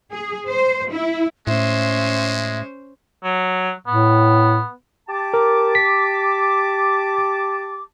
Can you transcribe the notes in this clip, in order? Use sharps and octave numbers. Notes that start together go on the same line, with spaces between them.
G#4
C5
E4
A2 G#3 C#4 C5 E5
F#3
A2 B3
G4 A5 D6
A#4
B6